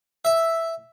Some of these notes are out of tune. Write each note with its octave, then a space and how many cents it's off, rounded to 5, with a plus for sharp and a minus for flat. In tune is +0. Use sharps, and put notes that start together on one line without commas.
E5 +0